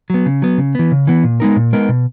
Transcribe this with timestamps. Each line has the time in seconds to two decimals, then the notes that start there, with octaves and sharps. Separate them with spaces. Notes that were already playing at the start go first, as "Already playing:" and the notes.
0.10 F#3 B3
0.26 C#3
0.42 F#3 B3
0.58 C#3
0.75 E3 B3
0.92 C#3
1.07 E3 B3
1.24 A#2
1.40 G#3 B3 D#4 A#4
1.56 A#2
1.73 G#3 B3 D#4 A#4
1.89 B2